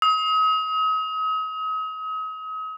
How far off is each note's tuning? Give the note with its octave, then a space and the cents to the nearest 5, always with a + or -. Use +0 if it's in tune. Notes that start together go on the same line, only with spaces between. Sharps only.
D#6 +40